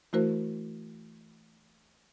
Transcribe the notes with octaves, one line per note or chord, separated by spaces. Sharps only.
E3 A3 E4 F#4 A#4 C5